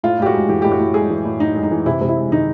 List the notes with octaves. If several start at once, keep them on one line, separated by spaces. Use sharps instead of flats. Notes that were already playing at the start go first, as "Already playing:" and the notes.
A2 F4
A2 G4
F#4
G#3
E3 G4
A2 G4
F#4
A2
G#3 G#4
E3
A2
A2 D#4
G#3
D#4
E3
C3 E4
C3
E4
G#3
D#3 D#4